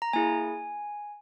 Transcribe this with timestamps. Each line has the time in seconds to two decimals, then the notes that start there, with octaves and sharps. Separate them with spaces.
0.02 A#5
0.13 A#3 E4 G#4 G#5